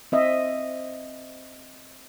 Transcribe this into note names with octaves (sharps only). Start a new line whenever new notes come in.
C4 D#5 E5